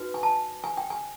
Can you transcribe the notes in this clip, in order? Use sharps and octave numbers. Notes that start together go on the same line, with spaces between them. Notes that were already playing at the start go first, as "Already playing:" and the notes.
Already playing: D#4 F#4 B4
G#5
A5
G#5
G5
G#5